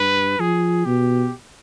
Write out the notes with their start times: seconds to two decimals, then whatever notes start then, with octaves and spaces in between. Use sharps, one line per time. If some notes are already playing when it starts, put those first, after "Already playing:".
Already playing: G2 B4
0.39 F3 G#4
0.85 B2 G4